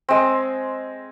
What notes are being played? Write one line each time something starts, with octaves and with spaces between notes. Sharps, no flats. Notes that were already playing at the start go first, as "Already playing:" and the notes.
G#3 C4